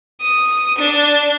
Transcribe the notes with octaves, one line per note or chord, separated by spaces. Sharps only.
D#6
D4